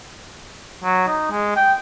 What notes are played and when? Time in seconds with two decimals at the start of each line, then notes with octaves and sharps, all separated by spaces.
0.84 F#3
1.08 D#4
1.31 G#3
1.56 G5